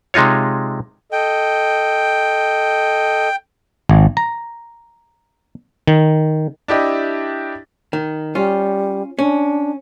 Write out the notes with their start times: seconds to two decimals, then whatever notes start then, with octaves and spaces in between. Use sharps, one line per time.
0.14 C3 G#3 D#4 F4 C#5
1.12 A4 D#5 G5
3.89 G#1
4.17 A#5
5.87 D#3
6.68 D4 E4 G4 D#5
7.93 D#3
8.35 G3 C#4 F4
9.19 C#4 D4